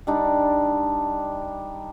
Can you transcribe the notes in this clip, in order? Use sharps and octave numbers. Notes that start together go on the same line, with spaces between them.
G3 D4 D#4